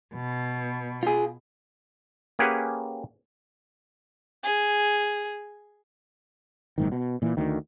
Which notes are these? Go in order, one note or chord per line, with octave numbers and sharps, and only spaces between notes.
B2
F4 G#4
A#3 C#4 G4 G#4 B4 F#5
G#4
F#1 G#2 D#3
B2
A#2 E3
D2 D#3